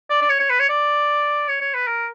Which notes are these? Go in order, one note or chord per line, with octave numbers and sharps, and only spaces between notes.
D5
D5
C#5
C#5
B4
C#5
D5
C#5
C#5
B4
A#4